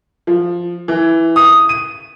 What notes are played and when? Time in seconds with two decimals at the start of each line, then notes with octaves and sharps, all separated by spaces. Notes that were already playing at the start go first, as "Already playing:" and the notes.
0.27 F3
0.88 E3
1.36 D#6
1.69 D#7